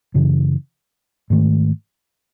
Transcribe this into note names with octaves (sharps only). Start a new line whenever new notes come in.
F#2 C#3 E3
G#2 D#3 A3